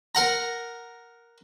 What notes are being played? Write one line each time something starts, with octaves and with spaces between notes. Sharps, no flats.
A#4 F#5 A#5